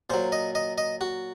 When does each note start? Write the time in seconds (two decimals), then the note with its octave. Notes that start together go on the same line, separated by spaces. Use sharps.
0.10 A#2 F#3 C5
0.32 D#5
0.55 D#5
0.78 D#5
1.01 F#4